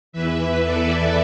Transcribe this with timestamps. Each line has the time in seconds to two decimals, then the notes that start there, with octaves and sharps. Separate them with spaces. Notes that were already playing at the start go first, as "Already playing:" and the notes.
0.12 E2 E3 B4 E5
0.64 A4 D5